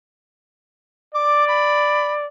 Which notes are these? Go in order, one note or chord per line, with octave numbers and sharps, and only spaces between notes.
D5 D6
B5